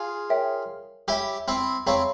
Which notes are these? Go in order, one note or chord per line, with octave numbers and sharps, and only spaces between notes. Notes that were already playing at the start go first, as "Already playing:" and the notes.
Already playing: F4 G#4
A#4 C#5 E5 G5
E4 G4 C#5 E5 G#5
C4 E4
C4 E4 G#4 C#5 F5 A#5 C#6